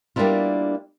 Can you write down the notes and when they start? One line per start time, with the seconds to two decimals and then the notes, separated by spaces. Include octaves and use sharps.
0.16 G3 A#3 B3 D4 E4 F4